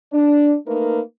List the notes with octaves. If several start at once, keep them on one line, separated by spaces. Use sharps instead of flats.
D4
A3 A#3 D#4 A#4 B4